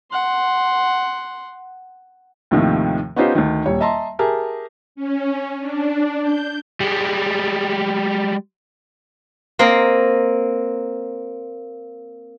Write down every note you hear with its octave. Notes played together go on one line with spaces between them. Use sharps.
F#5 C6
D#2 A2 C3 D#3 F3
B3 C#4 D#4 F4 G4 C5
D2 D#3
D#1 G3 C#5
D#5 E5 A5 A#5 C6
G4 G#4 A#4 E5 A5
C#4
D4
G6
G3 G#3
A#3 C4 A#4 D#5